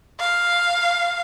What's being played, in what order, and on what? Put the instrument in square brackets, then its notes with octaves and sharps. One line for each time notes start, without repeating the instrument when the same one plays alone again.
[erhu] F5